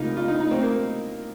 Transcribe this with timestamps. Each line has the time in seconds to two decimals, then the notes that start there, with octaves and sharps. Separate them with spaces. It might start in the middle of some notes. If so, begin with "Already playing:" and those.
Already playing: C#2 C3 A#3 D#4 F4
0.17 F4
0.28 D#4
0.40 D#4
0.51 C4
0.62 A#3